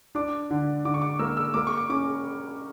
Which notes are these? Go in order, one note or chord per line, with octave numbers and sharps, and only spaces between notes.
D4 D6
D3
D3 D6
C#6
D6
A#3 E6
E6
A#3 D6
C#6
D6
C#4 D6